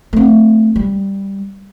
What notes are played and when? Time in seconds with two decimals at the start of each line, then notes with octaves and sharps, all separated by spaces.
0.13 A3 C4
0.76 G3